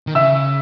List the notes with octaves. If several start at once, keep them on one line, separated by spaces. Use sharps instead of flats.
D#3
C#3 E5 E6